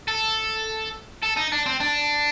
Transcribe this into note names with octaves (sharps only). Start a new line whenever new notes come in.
A4
A4
D#4
D4
C4
D4